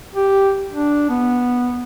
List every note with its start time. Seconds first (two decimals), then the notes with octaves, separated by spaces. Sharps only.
0.15 G4
0.72 D4
1.09 B3